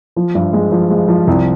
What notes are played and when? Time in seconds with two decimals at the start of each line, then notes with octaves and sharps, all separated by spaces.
0.16 F3
0.35 G2
0.53 G#3
0.72 F3
0.90 G#3
1.08 F3
1.27 C2